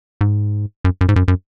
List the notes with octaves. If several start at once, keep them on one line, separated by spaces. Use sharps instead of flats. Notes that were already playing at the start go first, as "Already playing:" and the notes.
G#2
F#2
F#2
G#2
F#2
F#2